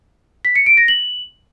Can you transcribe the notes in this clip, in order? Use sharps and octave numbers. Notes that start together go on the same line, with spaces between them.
B6
C#7
D7
A#6
F#7